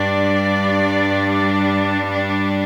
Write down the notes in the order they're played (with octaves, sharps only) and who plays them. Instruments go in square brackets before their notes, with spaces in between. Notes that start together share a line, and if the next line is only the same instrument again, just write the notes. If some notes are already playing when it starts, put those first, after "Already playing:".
Already playing: [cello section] G2 G3 D4 D5